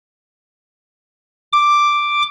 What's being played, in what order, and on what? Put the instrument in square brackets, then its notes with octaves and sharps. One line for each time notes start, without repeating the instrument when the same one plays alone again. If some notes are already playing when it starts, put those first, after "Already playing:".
[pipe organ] D6